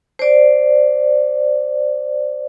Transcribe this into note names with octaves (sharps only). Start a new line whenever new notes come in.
C5 D5